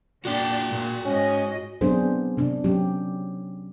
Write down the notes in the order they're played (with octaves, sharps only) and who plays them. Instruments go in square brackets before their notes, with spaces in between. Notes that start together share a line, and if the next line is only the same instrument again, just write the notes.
[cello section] A#2 D4 [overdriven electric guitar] F#4 G5
[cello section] A#2
[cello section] G#2 D#5 [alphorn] C#4
[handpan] F#3 B3 C4 D4 G#4 C5
C3 D4
F#3 C#4 G4